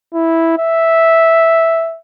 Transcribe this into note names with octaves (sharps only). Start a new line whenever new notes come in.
E4
E5